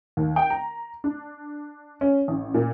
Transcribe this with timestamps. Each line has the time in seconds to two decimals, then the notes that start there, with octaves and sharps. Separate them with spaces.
0.17 D#2
0.36 G5
0.50 A#5
1.04 D4
2.01 C#4
2.28 A1
2.54 A#2